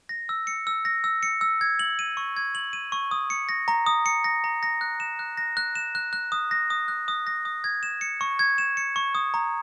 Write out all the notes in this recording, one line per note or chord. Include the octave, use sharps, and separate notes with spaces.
A#6
E6
C#7
E6
A#6
E6
C#7
E6
G#6
F#7
D#7
C#6
G#6
F#7
D#7
C#6
D#6
C#7
A#6
A#5
D#6
C#7
A#6
A#5
A#6
F#6
E7
F#6
A#6
F#6
E7
F#6
F#6
D#6
A#6
D#6
F#6
D#6
A#6
D#6
G#6
E7
C#7
C#6
G#6
E7
C#7
C#6
D#6
A#5